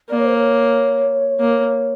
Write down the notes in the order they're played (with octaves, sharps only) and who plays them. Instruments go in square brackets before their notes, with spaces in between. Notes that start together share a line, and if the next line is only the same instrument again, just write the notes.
[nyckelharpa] A#3 [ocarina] D5
[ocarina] C#5
C5
C#5
[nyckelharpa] A#3